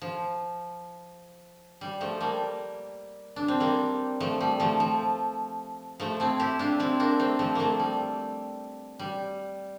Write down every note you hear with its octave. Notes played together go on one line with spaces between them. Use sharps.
F3
G3
F3 A3
G3 A#3
D4
C4
G3 A#3
F3 A3
G3
F3 A3
F3
F3 A3
C4 E4
E4 G4
D4 F4
C4 E4
A#3 D4
A3 C4
F3 A3
F3 A3 A#3
G3
G3